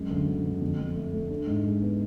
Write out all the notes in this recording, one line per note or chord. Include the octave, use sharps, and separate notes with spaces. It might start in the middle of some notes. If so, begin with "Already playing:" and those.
Already playing: F#2 G#3
D2
D2
D2
F2
F2
A3
A3
D4
G#2
G#3
B3